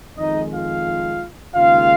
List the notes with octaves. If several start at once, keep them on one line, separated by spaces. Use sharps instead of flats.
F2 D#3 G#3 D#4 D#5
F4 F5
D#2 C#3 G#3 F4 F5